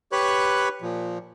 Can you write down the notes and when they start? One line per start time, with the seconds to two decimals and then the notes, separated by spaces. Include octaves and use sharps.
0.12 G4 B4 C#5 B5 C#6 F#6
0.82 A#2 F3